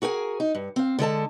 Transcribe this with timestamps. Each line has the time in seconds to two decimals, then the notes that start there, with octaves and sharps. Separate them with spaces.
0.02 F#4 G#4 A#4 G5 G#5
0.40 D#4
0.55 G2
0.76 C4 F5
0.99 D3 G#3 A4 A5